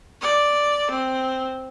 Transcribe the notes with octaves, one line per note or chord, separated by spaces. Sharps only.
D5
C4